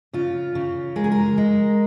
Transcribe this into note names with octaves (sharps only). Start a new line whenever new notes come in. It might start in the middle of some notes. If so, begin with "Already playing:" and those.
C#3 F4
C#3
G#3 A#4
G#4
A#4
G#3